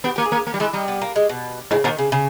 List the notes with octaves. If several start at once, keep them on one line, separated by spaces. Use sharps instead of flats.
B3 G4
A#3 G4
G#4
A#3
A#3
G3
G#3 E4
G3 D#4
B3
A#3
G#3
B2
G#2 C#3
A#2 D#3
C#3
C#3